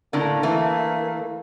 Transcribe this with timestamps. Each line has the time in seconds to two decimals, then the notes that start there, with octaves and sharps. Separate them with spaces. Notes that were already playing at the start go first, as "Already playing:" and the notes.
0.13 A2 D3 A#3
0.43 E3 A3